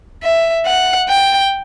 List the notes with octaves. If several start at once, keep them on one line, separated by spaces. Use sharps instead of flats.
E5
F#5
G5